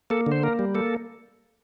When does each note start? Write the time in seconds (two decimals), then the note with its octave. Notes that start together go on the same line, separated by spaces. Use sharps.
0.10 A#3 A4
0.26 D3
0.32 C5
0.43 A#3 A#4
0.59 G3
0.75 A#3 A4